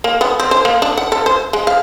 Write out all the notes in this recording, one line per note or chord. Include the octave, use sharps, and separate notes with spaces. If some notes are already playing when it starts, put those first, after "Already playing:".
A#3
B3
C4
C5
A#3
D4
F#5
A4
C5
G#3
F5